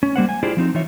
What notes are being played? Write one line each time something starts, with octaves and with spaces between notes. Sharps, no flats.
C#4
G3 A#3 C5 F#5
G#5
D4 E4 F4 G4 G#4 C5
F3 C4 D#4
E3 D#4 F4 C#5 E5